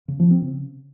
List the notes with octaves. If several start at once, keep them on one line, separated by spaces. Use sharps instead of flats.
C#3
F3
C4
C#3